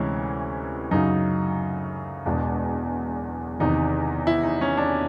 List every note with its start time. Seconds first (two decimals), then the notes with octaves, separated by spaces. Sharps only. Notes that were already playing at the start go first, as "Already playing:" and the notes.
Already playing: D2 C3 E3 G#3 C#4 E4
0.91 F#2 C#3 F#3 D#4
2.26 E1 E2 B2 G#3 D4
3.60 E2 C3 D#3 D#4
4.27 E4
4.43 D#4
4.61 C#4
4.77 D4